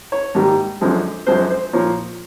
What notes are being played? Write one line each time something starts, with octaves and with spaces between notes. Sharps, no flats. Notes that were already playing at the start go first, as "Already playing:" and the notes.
C#5
G#2 D#3 G3 A#3
F#2 D3 F3 G#3 C4
F#2 D3 F3 G#3 C4 C5
C5
A#2 F3 A#3 C#5